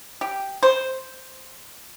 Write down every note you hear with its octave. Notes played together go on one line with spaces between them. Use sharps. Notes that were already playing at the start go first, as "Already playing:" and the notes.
G4
C5